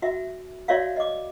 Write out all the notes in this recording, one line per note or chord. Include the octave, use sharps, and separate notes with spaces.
F#4 E5
F#4 C#5 D5 E5 F5
D#5 D6